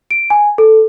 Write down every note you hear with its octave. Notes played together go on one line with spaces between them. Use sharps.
D7
G#5
A4